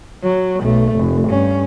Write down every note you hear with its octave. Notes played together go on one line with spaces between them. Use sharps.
F#3
B1 A3
F1
G2 C#4